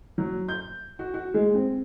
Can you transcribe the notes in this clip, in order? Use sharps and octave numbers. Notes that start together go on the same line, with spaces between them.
F#3
G6
F#4
F#4
G#3
C4